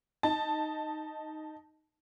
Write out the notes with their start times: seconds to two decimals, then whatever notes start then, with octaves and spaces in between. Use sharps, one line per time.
0.23 D#4 A5